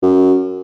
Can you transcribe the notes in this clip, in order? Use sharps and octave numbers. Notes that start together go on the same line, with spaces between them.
F#2